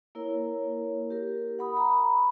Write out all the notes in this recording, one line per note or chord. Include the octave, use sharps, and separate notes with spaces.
A#3 E4 A#4 C#5
G4 A#4
F#5 B5 D#6
A#5 B5